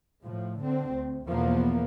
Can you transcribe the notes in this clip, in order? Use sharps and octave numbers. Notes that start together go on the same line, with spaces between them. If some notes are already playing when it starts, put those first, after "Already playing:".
A2 F3
D3 C4
D2
E2 B2 F3 A#3 B3